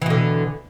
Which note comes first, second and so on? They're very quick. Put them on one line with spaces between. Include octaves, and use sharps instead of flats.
E3 B2 D3